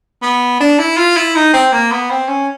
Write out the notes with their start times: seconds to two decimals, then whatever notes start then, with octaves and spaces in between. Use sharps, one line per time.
0.22 B3
0.60 D4
0.79 E4
0.97 F4
1.17 E4
1.35 D#4
1.53 C4
1.72 A#3
1.92 B3
2.10 C4
2.28 C#4